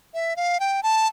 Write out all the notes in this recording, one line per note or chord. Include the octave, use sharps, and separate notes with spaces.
E5
F5
G5
A5